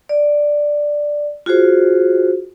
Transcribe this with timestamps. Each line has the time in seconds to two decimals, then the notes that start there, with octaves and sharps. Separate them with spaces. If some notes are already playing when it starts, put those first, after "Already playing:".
0.09 D5
1.46 F4 F#4 G#4 C5